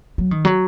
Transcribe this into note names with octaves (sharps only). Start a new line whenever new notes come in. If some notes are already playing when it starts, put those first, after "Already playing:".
F#3
D#3
F#3